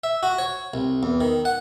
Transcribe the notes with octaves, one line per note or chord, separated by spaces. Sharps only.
E5
F#4
C#5
C2
E2
D#3
F#5